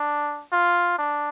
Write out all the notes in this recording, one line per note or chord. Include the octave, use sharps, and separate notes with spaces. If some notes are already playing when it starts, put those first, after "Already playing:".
Already playing: D4
F4
D4